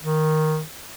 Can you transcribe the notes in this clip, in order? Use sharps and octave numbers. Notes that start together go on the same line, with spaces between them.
D#3